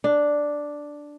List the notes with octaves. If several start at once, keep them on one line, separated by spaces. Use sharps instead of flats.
D4